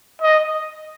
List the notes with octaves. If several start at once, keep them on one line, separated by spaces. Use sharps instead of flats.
D#5